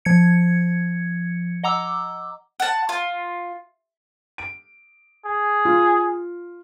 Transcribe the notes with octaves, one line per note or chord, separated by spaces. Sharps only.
F3 G#6 C#7
D#5 F#5 A#5 D6 E6
F#5 A5
F4
D7
G#4
F4